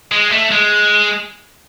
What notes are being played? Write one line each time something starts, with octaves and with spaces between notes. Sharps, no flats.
G#3
A3
G#3